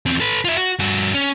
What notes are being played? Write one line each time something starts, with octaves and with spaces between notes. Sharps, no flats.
E2 C4
A4 B4
F4 E5
F#4
G2 F#4
C#4